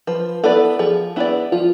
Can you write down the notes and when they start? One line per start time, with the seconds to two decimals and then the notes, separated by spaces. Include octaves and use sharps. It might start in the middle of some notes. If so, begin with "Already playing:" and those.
0.07 F3 B4
0.43 B3 E4 A4 B4 D5
0.79 F3 G#4
1.16 B3 E4 B4 D5
1.52 F3 F4